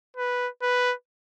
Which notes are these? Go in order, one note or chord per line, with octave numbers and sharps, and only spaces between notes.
B4
B4